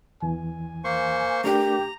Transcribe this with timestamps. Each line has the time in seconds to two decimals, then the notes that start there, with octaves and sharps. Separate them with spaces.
0.22 E2 E3 G#5
0.84 A#3 C5 C#6
1.44 A3 D4 G4 A#4 A#5